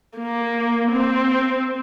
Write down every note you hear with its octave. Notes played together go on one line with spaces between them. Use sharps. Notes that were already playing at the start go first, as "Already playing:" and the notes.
A#3
C4